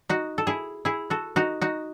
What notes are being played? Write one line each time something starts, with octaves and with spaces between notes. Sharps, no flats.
D#4 F#4
A4
E4 G#4
E4 G#4
F#4 A4
D#4 F#4
D#4 F#4